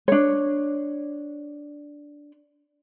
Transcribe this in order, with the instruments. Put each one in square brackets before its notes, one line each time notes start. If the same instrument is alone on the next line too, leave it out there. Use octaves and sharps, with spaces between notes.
[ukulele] D4 C#5